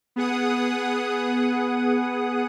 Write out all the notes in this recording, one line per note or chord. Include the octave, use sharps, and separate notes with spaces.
B3 G#4 F#5 D#6